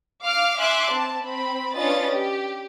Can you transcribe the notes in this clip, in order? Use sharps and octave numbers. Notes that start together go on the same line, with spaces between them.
F5 D6 F6
E5 G#5 C6 D6 F#6
C4 A5
C4 B5
C#4 D4 F4 B4 D#5 A6
G4